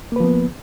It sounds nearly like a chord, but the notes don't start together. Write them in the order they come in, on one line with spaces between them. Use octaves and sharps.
A#3 B4 F3 B3